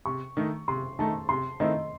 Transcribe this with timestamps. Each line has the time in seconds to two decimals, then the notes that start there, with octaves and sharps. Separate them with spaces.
0.06 C3 C#6
0.37 D#3 A3 D#4
0.68 C3 C6
0.99 D#3 A3 D#4 A5
1.29 C3 C6
1.60 D#3 A3 C4 E4 D#5